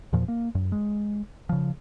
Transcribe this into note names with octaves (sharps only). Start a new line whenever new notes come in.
E2 A#2 F3
A#3
F#2
G#3
C#3 F3